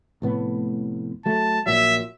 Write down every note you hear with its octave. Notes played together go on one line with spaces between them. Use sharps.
F1 A2 B3
F#3 A3 A5
A#1 A#2 F#3 E5